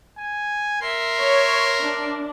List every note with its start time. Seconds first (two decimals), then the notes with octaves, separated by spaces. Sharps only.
0.18 G#5
0.81 A#4 E5 C6
1.19 C#5
1.81 D4